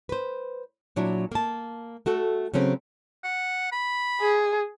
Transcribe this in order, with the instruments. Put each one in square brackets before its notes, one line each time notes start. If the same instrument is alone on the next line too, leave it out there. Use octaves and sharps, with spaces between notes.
[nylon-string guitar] B4 C5
A#2 F#3 D4 E4
A#3 A5
A3 F#4 A4
C#3 F#3 A3 C4 C#4
[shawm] F#5
B5
[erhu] G#4